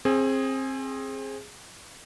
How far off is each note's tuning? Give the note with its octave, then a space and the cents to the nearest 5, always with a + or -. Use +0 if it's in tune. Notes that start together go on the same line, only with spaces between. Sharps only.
C4 +25 G#4 +0